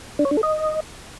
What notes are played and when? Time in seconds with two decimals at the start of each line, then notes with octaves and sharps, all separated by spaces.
0.19 D4
0.25 C#5
0.31 D4
0.37 A4
0.43 D#5